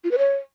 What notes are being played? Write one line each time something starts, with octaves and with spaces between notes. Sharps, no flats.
F4
B4
C#5